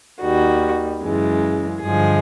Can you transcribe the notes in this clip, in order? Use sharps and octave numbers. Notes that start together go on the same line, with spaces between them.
D#2 D#3 G3 F#4
F#2 C#3 E3 G#3
G2 D3 F3 G#3 G#4